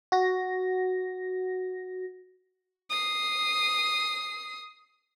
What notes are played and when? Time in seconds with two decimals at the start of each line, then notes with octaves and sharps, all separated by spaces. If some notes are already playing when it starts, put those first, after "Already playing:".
0.12 F#4 A#6
2.90 D#6 C7